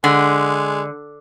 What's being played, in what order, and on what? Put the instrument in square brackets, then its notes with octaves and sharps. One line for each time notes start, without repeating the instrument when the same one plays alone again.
[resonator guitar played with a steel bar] D3 [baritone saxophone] G#3